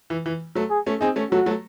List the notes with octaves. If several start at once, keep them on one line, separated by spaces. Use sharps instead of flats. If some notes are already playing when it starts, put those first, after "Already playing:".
E3
E3
F#3 A3
G#4
A3 C#4
C4 D#4 G#4
A3 C#4
F#3 A3 F#4
F#3 A3